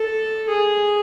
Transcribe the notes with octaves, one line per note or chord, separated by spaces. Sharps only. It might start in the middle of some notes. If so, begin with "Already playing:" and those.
Already playing: A4
G#4